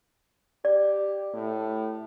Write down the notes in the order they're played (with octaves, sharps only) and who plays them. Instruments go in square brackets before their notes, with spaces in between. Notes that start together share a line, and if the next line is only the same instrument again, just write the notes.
[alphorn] G4 [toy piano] D5
[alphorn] A2